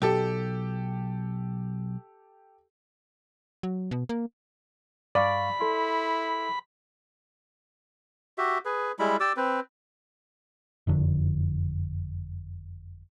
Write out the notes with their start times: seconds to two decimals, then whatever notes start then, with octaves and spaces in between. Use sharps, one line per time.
0.02 B1 G4 A4
3.63 F#3
3.91 B2
4.09 A#3
5.15 G2 D5 F5 B5 C#6
5.61 E4 A4 C6
8.38 F#4 G4 E5
8.65 G#4 B4
8.99 G3 G#3 E4 B5
9.20 G4 D5 D6 E6
9.37 C4 B4
10.87 F#1 F2 D3